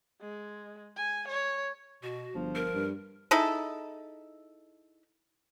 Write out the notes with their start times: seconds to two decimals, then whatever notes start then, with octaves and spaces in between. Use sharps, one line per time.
0.21 G#3
0.97 G#5
1.28 C#5
2.03 B2 F#4
2.35 G1 F3
2.55 A#4
2.74 G2
3.31 D#4 E4 G#4 A4